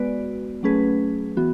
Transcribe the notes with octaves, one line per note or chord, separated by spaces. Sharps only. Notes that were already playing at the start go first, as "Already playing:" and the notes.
Already playing: G#3 B3 F#4 B4 D5
F#3 A3 C#4 G#4 B4
E3 B3 F#4